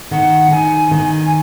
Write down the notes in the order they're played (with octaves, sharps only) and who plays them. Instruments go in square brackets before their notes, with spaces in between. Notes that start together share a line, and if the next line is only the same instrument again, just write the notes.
[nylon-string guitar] D#3 [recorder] F#5
[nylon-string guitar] D#3 [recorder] G#5
[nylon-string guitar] D#3